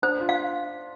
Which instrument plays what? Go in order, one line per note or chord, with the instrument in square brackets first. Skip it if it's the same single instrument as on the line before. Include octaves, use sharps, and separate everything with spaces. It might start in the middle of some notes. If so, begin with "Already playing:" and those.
[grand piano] D4 [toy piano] C5
[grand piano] F4
[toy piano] F5